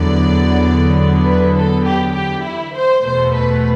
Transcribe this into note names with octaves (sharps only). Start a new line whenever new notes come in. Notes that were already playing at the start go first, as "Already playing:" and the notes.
Already playing: E2 D3 F#3 B3 D5
B4
A4
G4
G4
E4
C5
E2 B2 A3 C5
B4